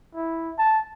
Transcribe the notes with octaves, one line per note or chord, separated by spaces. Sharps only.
E4
A5